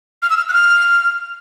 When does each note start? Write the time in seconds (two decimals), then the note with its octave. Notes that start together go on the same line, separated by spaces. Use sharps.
0.22 F6
0.30 E6
0.37 F6
0.49 F#6
0.53 F6